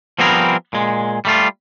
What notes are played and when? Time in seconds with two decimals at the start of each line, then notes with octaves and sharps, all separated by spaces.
0.19 F3 G3 B3 C4 G#4 A#4
0.73 A#2 G#3
1.25 G3 A3 F4